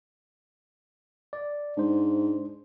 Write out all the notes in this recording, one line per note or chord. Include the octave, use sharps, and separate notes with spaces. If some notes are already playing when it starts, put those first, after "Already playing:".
D5
G#2 D4 C5